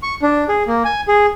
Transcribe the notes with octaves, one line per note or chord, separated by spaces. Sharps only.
C#6
D4
G#4
A#3
G#5
G#4